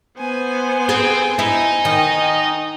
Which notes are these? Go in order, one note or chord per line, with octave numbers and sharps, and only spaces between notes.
B3 C5 G#5
C4 G#4
D#4 E4
D#3 D#5